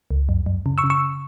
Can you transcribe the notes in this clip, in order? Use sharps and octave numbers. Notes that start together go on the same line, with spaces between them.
C#2
F#2
F#2
C#3
C#6 E6
C#3
C#6 E6